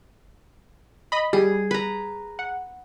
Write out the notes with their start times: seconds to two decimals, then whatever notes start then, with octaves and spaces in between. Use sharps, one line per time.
1.12 D#5 B5
1.33 G3 G#4
1.71 B4 A#5
2.39 F#5